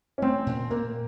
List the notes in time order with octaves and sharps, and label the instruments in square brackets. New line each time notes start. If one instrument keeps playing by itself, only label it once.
[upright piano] C#4
[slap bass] A3 [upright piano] C4
[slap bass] A#2
[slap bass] A#2 [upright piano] A#3